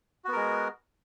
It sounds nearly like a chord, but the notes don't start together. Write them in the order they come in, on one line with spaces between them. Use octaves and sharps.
F#4 B3 A#4 G#3